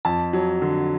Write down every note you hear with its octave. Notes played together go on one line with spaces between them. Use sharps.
F2 A5
F#3
D3